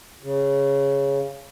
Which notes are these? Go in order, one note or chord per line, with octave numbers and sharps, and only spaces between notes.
C#3